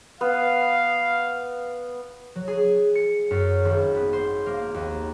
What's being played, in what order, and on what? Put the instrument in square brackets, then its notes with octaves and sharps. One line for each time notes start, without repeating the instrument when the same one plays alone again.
[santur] B3 [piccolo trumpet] F5
[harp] F#3
G#4
C#7
F#2
G#1
B3
C5
A#3
D#2